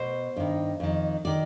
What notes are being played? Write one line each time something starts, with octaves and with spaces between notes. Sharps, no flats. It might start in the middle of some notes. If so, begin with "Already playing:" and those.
Already playing: B2 C5
G2 D#3
F2 D#3
D#3 D5